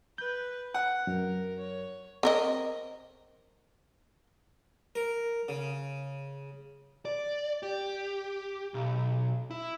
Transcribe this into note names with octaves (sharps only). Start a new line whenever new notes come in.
B4 G6
F#5
F#2 A#4
C#5
C4 A#4 D#5
A#4
C#3
D5
G4
B1
E4